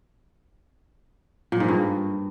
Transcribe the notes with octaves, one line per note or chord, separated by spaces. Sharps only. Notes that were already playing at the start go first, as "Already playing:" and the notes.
A#2
G#2
G2